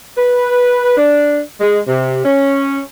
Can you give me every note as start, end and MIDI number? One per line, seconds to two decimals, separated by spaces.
0.17 0.95 71
0.97 1.41 62
1.61 1.79 56
1.87 2.20 48
2.25 2.80 61